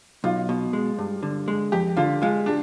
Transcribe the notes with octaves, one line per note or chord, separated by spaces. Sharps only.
B1 F4
B2
G#3
G2
D3
G#3
F2 G4
D3 F4
G#3 F4
D4